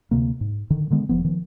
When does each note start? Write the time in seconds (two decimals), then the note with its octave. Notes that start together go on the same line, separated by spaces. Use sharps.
0.11 D2 C3 A#3
0.41 G#2
0.70 D3 D#3
0.90 D3 D#3 G#3 B3
1.09 E1 F3 B3
1.24 D#3 F3